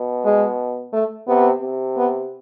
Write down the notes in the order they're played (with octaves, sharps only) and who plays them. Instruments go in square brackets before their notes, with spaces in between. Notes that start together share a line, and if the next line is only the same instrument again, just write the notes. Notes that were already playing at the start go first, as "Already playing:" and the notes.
Already playing: [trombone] B2
[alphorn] G#3
A3
[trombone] C3 [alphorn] B3
[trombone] C3
[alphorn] B3